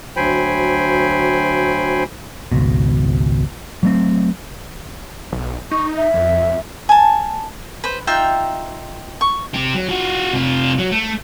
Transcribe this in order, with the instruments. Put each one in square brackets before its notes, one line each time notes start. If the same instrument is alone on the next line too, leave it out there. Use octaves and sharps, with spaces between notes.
[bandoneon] D2 F#3 C5 G5 G#5 B5
[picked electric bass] G#1 C#2 B2
F#3 A3 C4
[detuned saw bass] B1
[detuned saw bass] D#4 [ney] C#6
[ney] E5
[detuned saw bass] F2
F2
[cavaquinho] G#5 A5
B4 C5
D#4 F4 E5 G5
C#6
[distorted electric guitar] C4 G4
F#3
F4 F#4
C3 F4
F#3
A3